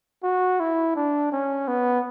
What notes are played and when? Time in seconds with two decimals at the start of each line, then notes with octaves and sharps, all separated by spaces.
0.23 F#4
0.60 E4
0.95 D4
1.32 C#4
1.68 B3